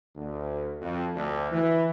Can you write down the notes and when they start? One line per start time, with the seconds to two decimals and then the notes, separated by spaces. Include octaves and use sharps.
0.16 D2
0.81 F2
1.15 D2
1.52 E3